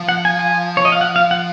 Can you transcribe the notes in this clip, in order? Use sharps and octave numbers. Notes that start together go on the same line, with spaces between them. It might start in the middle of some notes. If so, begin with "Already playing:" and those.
Already playing: F3
F#5
G#5
G#5
C#5
D#5
F5
F#5
F5
F#5